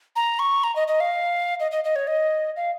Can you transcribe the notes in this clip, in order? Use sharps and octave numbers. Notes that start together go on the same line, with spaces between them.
A#5
C#6
A#5
D#5
D#5
F5
D#5
D#5
D#5
C#5
D#5
F5